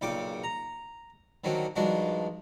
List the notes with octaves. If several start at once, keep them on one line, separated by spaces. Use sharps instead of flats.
B1 A#2 C#3 G5 D6
A#5
D3 D#3 F#3 A#3 C4
G2 D#3 F3 G#3 D4 F#4